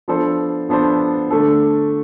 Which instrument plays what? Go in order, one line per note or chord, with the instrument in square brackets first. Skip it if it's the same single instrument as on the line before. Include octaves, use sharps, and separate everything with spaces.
[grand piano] F3 B3 D4 A4 C5
F3 B3 D4 A4 C5
D3 A3 D4 A4